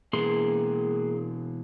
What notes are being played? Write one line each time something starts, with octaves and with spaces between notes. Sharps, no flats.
B2 E3 A#3 G#4 C6